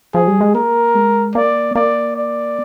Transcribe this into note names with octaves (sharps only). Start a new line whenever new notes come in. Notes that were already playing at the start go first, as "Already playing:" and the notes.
F3 G#4
G3
G#3
A#3 A#4
G#3
A#3 D5
A#3 D5
D5